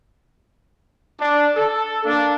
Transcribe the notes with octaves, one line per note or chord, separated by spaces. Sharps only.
D4
A4
A#3 D4